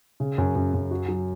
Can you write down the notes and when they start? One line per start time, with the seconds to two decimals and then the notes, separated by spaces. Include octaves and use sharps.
0.20 C#3
0.38 F#2
0.55 F#2
0.74 F#2
0.91 F#4
1.08 F#3